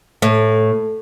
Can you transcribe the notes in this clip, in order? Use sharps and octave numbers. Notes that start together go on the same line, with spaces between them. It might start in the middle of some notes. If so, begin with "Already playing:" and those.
A2